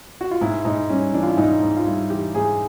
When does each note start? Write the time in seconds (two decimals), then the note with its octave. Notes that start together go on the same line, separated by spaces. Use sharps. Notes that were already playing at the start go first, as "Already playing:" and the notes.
0.21 F#4
0.31 F4
0.41 G#2 E4
0.65 G#2 D#4
0.89 G3 C#4
1.14 E3 D4
1.23 F4
1.30 E4
1.37 G#2 D#4
1.62 G#2
1.76 F4
1.86 G3 E4
2.10 E3 G4
2.35 G#2 G#4